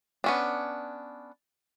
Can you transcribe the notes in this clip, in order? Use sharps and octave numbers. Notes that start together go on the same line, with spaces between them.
B3 C#4 D4